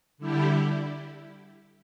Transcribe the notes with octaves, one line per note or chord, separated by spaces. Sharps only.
D3 G3 E4 G4